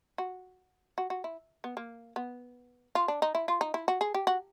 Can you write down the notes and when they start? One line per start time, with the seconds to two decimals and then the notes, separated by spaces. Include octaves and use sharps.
0.18 F#4
0.98 F#4
1.10 F#4
1.24 E4
1.64 B3
1.77 A#3
2.16 B3
2.95 F4
3.08 D4
3.22 D#4
3.35 E4
3.48 F4
3.61 D#4
3.74 E4
3.88 F#4
4.01 G#4
4.14 G4
4.27 F#4